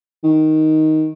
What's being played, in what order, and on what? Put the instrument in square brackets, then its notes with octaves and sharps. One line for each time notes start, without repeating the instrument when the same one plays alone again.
[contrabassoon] D#3